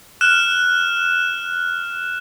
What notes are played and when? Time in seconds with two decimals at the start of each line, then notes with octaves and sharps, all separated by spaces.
0.21 F6 F#6 E7